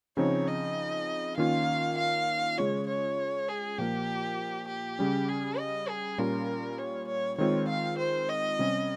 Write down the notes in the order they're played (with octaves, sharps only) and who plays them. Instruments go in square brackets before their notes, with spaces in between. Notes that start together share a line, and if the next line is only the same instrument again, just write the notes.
[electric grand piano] C#3 F3 C4 D#4 [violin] C#5
[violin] D#5
[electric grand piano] D#3 A#3 C#4 F4 [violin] F5
[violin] F5
[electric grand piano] C#3 G#3 C#4 F4 [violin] C#5
[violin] C#5
G#4
[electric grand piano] A#2 F3 A#3 F4 [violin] G4
[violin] G4
[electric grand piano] C#3 G3 C#4
[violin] G#4
D#5
G#4
[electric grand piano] A#2 G3 C#4 F4 [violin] A#4
[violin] C#5
C#5
[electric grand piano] D#3 G#3 C4 F4 [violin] C#5
[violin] F5
C5
D#5
[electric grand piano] C3 G3 C#4